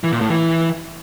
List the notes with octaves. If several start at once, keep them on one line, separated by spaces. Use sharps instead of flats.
E3
A#2
A2
E3